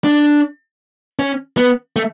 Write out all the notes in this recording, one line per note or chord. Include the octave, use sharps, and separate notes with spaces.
D4
C#4
B3
A3